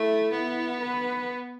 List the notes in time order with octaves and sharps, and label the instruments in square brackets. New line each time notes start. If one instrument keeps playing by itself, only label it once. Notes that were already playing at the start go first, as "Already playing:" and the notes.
Already playing: [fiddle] A3 [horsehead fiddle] E4
[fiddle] B3
[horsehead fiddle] B4